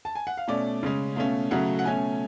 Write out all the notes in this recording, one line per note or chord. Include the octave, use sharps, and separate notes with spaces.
A5
G#5
F#5
F5
B2 A3 C#4 D5
C#3 G#3 C#4
B2 A3 C#4 F5
C#3 F#3 A3 C#4 F#5
F#5
B2 A3 C#4 G#5